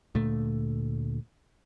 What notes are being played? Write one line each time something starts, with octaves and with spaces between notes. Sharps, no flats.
D2 A#2 A3